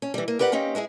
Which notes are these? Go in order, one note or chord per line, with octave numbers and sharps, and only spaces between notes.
C#4
E3 G3
A#3
G4 A#4 B4 D5 F#5
A#3 C4 C#4 D#4 G4
G#3 E4 F4 G#4